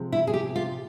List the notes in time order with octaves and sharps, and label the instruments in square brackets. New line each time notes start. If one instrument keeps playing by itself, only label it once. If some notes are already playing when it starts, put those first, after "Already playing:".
Already playing: [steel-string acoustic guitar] C3 F3 G#3
E4
G#4
G4
F4